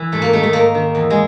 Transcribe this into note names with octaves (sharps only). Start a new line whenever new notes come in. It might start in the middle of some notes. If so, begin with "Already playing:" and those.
Already playing: E3
G#2 A3
A#3
D#3 A3
A3
G#2 A#3
D#3
E2
G#3